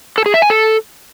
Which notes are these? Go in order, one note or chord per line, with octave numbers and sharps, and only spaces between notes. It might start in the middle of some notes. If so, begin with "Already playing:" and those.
A4
G#4
E5
G#5
A4